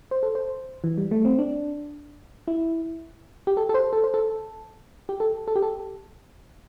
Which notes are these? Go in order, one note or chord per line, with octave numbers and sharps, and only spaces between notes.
C5
A4
C5
E3
G3
A3
C4
D4
E4
G4
A4
A4
C5
A4
C5
A4
G4
A4
A4
G4
A4